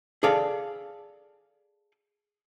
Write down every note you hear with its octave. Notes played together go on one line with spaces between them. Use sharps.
G#4 A4 D5 F5